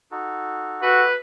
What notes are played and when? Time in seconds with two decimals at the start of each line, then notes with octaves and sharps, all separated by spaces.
0.11 D#4 F#4 A4
0.82 F#4 G4 A4 B4 E5